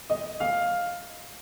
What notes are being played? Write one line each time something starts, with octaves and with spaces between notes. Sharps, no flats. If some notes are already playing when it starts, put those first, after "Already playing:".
D#5
F5